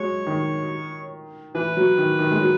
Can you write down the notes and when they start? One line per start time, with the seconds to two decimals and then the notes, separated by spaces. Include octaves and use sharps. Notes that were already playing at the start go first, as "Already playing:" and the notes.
Already playing: F#3 G#3 C#5
0.27 D#3
1.55 E3 B4
1.77 F#3
1.98 D#3
2.19 D#3
2.32 G#3
2.41 F#3